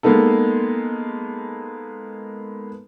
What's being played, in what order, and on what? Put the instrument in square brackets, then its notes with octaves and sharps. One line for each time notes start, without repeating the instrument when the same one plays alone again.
[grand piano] G#3 A#3 B3 D#4 A4